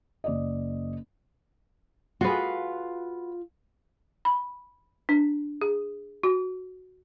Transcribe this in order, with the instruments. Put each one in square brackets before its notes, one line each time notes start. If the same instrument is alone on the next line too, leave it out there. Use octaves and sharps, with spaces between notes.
[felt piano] F#1 D5 D#5
[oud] F4 G#4 [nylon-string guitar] F#4 B4
[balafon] B5
D4
G#4
F#4